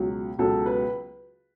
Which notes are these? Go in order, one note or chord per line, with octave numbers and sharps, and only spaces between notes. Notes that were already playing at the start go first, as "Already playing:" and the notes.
Already playing: C#2 B2 F#3
C#2 B2 F#3 A4
B4